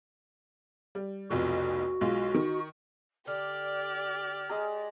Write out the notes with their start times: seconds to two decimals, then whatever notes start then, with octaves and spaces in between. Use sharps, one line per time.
0.95 G3
1.31 F1 B1 F2 F#4
2.01 B1 G#3 F4
2.34 D#3
3.27 D3 G4 D5 F6
4.49 G#3 G#4 A#5